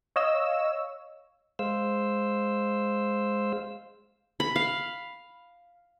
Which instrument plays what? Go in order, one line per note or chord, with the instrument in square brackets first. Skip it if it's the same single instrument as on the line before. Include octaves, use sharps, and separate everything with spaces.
[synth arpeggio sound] C#5 D#5 F5 E6
[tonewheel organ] G#3 C5 F5 E6
[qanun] B5
F5